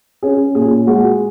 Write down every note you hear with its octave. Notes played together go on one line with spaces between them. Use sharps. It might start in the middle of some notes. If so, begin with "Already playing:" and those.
C#4 G#4
A#2 G#4
G#3 F#4